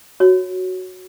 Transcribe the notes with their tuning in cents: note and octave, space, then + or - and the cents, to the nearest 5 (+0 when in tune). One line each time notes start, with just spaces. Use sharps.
F#4 +0 C#5 -5